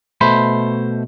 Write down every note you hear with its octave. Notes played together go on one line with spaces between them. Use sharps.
B2 A3 C5 B5